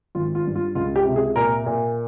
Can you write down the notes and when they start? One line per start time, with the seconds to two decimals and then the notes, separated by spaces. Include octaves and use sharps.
0.15 G#1 F4
0.35 F4
0.45 G2
0.55 F4
0.75 C#2 F4
0.96 G4
1.06 C3
1.16 G#4
1.36 A#2 A#4
1.66 A#2